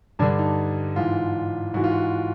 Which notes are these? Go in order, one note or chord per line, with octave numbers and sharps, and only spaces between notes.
G2 D3 D4
D#4
G#2 E3 F4
G#2 E3 F#4
F4
F#4